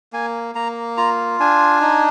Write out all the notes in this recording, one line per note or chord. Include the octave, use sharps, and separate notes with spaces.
A#3 G#5
A#3 A#5
F4 A#5
D4 G#5
D#4